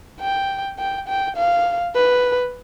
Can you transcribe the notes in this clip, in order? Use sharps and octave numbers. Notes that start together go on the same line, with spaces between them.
G5
G5
G5
F5
B4